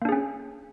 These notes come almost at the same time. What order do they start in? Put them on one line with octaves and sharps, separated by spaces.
A#3 D4 G#4 C#4